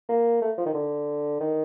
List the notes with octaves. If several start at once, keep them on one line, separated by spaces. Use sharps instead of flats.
A#3
A3
F3
D#3
D3
D#3